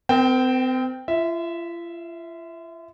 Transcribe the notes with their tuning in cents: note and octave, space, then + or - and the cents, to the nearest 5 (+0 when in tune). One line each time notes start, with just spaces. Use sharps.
C4 -35 A#4 +0 G5 +0
F4 -40 E5 -10